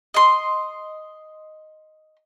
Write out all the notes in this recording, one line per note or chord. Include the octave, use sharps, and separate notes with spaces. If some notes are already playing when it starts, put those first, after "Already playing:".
D#5 C6